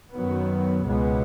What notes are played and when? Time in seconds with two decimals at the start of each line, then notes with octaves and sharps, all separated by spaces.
0.13 F#2 D#3 F#3 B3
0.85 C#2 B2 G#3 B3